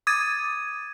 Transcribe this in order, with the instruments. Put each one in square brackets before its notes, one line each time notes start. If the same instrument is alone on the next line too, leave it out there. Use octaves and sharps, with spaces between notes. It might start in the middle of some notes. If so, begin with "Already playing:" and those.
[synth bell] D6 D#6 G#6 A6 D#7